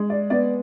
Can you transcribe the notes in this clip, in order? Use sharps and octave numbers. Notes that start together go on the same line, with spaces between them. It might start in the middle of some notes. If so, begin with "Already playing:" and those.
Already playing: G#3
D5
B3 D5